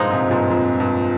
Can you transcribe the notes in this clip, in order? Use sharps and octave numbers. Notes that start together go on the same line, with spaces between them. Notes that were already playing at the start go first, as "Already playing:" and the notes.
Already playing: G2 A#2 F3 G#3 D#4
G#2 C3
G2 A#2
F2 G#2
G2